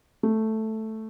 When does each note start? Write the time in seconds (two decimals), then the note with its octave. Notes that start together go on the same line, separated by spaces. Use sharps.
0.23 A3